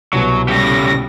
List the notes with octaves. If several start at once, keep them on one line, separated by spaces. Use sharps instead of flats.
C2 B2 F#3
A2 C#3 G3 G4 A#6